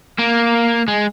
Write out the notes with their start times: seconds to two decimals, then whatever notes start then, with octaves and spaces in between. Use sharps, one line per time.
0.19 A#3
0.88 G#3